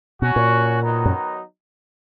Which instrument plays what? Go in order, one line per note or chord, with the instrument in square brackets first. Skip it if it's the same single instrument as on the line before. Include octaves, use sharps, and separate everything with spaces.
[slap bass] B2 [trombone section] F#3 C#4 F#4
[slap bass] A#2
[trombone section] D#3 F#3 B3 D#4
[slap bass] F#2